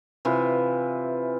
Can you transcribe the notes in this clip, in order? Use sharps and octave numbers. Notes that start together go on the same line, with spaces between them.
C3 E3 F4 B4